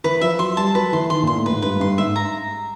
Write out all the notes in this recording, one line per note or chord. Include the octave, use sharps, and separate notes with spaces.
E3 B4
F3 E5
F#3 C6
G3 A5
F#3 B4
E3 C6
D#3 C6
A#2 C6
A2
G#2 B4
G2 B4
G2 C6
G#2 E5
A#5